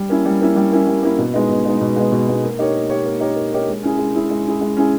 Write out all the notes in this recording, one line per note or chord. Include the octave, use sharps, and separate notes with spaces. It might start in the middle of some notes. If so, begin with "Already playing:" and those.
Already playing: G3
A#3 C#4 E4
G3
A#3 C#4 E4
G3
A#3 C#4 E4
G3
A#3 C#4 E4
B2
G#3 B3 D#4
B2
G#3 B3 D#4
B2
G#3 B3 D#4
B2
G#3 B3 D#4
A#3
D#4 G4 A#4 C#5
A#3
D#4 G4 A#4 C#5
A#3
D#4 G4 A#4 C#5
A#3
D#4 G4 A#4 C#5
G#3
C#4 E4 G#4
G#3
C#4 E4 G#4
G#3
C#4 E4 G#4
G#3
C#4 E4 G#4